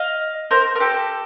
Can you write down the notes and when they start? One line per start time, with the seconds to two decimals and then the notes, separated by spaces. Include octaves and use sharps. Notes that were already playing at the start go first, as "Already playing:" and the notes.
Already playing: D#5 F5
0.51 A#4 C5
0.75 A#4
0.80 G4 A4